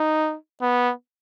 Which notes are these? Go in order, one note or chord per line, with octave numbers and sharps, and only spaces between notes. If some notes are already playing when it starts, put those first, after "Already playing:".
Already playing: D#4
B3